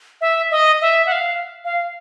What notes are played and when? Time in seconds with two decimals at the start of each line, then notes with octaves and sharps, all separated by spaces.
0.21 E5
0.51 D#5
0.81 E5
1.06 F#5
1.12 F5
1.65 F5